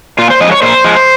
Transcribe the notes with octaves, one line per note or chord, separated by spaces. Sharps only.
A#2 F4
C5
F3 G#3 D#5
C#5
A#2 C5
F3 G#3